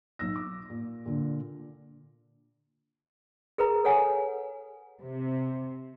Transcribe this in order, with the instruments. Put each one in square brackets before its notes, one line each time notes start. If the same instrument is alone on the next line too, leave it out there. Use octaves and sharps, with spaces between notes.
[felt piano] B1 E6 A#6
D6
A#2
A#2 D3
[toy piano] G#4 A#4 B4 A#5
A4 C#5 F#5 G#5
[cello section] C3